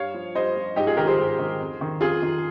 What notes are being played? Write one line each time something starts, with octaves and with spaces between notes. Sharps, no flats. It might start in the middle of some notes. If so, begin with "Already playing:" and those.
Already playing: G2 C#5 F5
F3
G2 C5 D#5
F3
G#2 D#4 G4
F4 G#4
D#3 G4 A#4
G#4 C5
G#2
D#3
F2
D#3
F2 F4 G#4
D#3